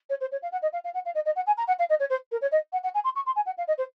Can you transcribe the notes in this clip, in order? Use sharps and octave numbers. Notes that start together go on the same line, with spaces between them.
C#5
C5
C#5
F5
F#5
D#5
F5
F5
F#5
F5
D#5
D#5
F#5
G#5
A#5
F#5
F5
D#5
C#5
C5
A#4
C#5
D#5
F#5
F#5
G#5
C6
C#6
C6
G#5
F#5
F5
D#5
C5